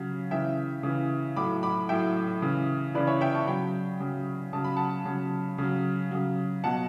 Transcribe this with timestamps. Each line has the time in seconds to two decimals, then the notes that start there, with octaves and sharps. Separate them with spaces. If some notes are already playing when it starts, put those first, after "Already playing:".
Already playing: C#3 F#3
0.31 C#3 E3 E5 G5
0.83 C#3 E3
1.36 A2 F#3 B5 D6
1.63 B5 D6
1.89 A2 F#3 E5 G5
2.42 C#3 E3
2.94 C#3 E3 B4 D5
3.07 C#5 E5
3.21 E5 G5
3.34 A5 C#6
3.47 C#3 F#3 G5 B5
4.00 C#3 F#3
4.53 C#3 F#3 A5
4.64 B5
4.76 F#5 A5
5.05 C#3 F#3
5.58 C#3 F#3
6.11 C#3 F#3
6.64 B2 F#3 F#5 A5